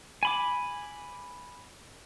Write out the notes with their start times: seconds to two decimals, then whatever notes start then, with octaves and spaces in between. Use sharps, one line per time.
0.23 G#5 B5 D6